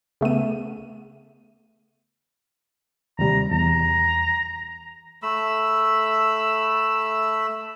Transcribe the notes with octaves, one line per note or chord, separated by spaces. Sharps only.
C#3 A3 B3 D#7
D#2 C3 G3 A#5
E2 A#5
A3 B5 E6